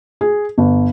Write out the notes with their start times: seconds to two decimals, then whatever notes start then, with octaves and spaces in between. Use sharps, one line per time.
0.21 G#4
0.58 G1